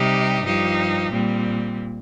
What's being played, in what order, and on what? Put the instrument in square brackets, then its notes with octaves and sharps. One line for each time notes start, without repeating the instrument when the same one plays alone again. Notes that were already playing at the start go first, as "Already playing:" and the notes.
Already playing: [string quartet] C3 G3 D#4 G4
G2 F3 D#4 G4
A#2 G3 C4